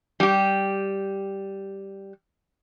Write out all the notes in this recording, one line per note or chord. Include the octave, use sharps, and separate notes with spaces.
G3 G4